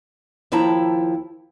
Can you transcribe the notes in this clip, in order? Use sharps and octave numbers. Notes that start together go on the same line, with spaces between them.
D#2 F3 E4 G5 A5 A#5